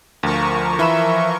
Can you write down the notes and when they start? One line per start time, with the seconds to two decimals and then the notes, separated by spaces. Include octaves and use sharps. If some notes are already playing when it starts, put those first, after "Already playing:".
0.23 D2 F3 A#4 C#6
0.79 E3 E5 B5 E7